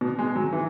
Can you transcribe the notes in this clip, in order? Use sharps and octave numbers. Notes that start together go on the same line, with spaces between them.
B2
G#3
F#3
E3